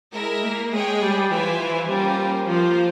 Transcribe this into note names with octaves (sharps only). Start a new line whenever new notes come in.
G#3 E4 A#4 E5
A#3
G#3 G#4 C#5 G5
G3
E3 F4 C5 E5 G#5
E3
G3 A#3 C#4 F4 C5
F3 A#3 F4 C5